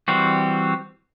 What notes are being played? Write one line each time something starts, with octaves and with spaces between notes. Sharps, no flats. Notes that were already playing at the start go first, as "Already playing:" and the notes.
E3 G3 C4 F#4